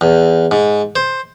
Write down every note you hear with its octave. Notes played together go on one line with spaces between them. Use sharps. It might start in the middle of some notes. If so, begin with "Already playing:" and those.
E2
G#2
C5